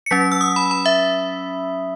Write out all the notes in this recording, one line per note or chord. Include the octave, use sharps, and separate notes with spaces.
C#7
F#3 C#4 B6
B6
E6
D#6
B5
B5
E5